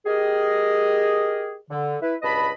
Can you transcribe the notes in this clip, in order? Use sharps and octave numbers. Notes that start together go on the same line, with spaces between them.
G4 G#4 A#4 D#5
D3
E4 B4
C#2 G2 B4 D#5 A5 B5